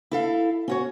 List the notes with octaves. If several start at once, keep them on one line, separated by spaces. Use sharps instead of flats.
E4 A4 F5
C#4 F#4 C#5